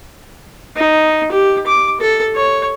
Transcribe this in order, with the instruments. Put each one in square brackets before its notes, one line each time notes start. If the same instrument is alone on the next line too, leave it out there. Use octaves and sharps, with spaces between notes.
[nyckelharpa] D#4
G4
D6
A4
C#5